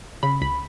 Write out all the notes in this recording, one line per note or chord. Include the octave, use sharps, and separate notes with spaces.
C#3 B5
C#2 B5